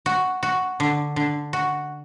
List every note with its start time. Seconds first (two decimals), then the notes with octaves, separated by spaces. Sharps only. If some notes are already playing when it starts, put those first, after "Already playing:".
0.06 F#4
0.43 F#4
0.80 D3
1.16 D3
1.53 F#4